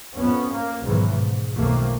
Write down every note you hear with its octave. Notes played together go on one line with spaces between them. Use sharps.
F2 B3 C#4
A#3
B1 G#2 B2 D#3 E3
G#2
B1 F2 D#3 A3 A#3